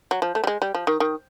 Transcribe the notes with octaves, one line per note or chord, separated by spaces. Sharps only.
F#3
F3
A3
G3
G#3
G3
F3
D#3
D#3